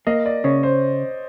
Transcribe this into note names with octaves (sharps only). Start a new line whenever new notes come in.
A#3 D#5
D5
C#3 C#5
C5